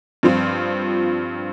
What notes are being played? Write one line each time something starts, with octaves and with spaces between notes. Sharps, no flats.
G2 F3 C4 F4